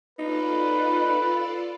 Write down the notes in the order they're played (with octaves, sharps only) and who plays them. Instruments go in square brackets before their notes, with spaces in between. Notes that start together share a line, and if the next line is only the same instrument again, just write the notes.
[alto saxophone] D#4 [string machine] F4 A4 D5 [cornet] B4